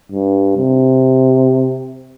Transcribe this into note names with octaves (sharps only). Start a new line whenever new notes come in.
G2
C3